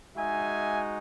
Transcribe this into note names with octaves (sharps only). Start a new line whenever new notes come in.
G#3 D#4 F#4 E5 G#5